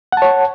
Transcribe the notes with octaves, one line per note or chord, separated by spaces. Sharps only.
C#5 F#5 A5